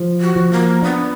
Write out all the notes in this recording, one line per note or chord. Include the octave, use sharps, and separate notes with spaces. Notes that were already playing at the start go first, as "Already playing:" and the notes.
Already playing: F3
F#4
F3
A#3
B3 D4